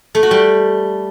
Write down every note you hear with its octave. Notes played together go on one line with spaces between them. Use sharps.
A3
F#4
G3